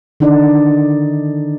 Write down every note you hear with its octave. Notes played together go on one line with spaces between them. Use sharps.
D3 D#3 D4 D#4 D5